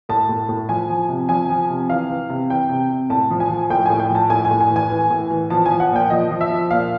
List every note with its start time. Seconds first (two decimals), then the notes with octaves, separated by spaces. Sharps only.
0.09 A2 A5
0.29 A2
0.49 A2
0.69 F3 G#5
0.89 F3
1.09 C3
1.29 F3 G#5
1.49 F3
1.70 C3
1.90 E3 F5
2.10 E3
2.29 C3
2.50 E3 G5
2.69 C3
2.90 C3
3.10 A2 A5
3.30 F3
3.40 G#5
3.50 F3
3.70 A2 G5
3.86 A2 G#5
4.00 G5
4.10 F3
4.15 A5
4.30 A2 G#5
4.45 G#5
4.51 A2
4.61 G#5
4.70 E3
4.76 G#5
4.90 E3
5.10 A2
5.31 E3
5.50 F3 A5
5.66 F3 G#5
5.80 F#5
5.91 A#2 G5
6.10 F3 D#5
6.31 F3
6.41 E5
6.51 F3
6.71 A#2 F5